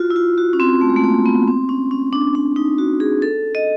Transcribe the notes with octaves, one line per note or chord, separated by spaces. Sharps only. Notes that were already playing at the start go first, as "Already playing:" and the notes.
Already playing: F4 F#4
E4
F4
F#4
C#4
C4
A3
G#3
A3
A#3
B3
C4
C#4
C#4
D4
D4
D#4
F#4
G#4
A4
D#5